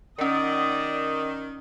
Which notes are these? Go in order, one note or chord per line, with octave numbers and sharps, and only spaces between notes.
D#3 C#4 A#4 D5 D#6